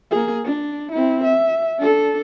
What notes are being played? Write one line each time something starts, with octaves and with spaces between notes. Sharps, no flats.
A#3 G#4
D4
C4 E4
E5
D4 A4